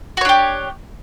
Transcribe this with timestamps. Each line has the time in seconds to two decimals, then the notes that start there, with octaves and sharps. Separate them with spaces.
0.17 F#4
0.21 C#5
0.25 D4
0.29 G4